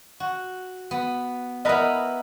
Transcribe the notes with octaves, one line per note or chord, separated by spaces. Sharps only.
F#4
B3
B3 E4 A#4 B4 D#5